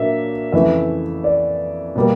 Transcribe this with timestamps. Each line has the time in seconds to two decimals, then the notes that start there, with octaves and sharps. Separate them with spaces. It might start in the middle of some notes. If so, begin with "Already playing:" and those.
Already playing: A#2 F#3 A#3 D4 E5
0.52 F2 C#3 E3 A3 E5
1.24 D5
1.96 B2 G3 A#3